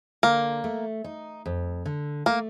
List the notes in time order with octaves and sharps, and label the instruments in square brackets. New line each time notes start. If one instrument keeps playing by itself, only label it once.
[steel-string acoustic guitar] D3 [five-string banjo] A#3
[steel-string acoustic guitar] A3
D#4
F2
D3
[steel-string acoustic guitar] A3 [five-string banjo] A#3